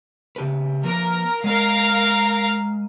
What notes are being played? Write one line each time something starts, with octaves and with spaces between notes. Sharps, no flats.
C#3 G4 B4
F3 A#3 A#4 B4
G#3 A#4 F5